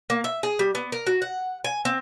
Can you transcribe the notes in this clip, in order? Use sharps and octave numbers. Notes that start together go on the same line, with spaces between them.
A#3
E5
G#4
G3
B3
A#4
F#4
F#5
G#5
C4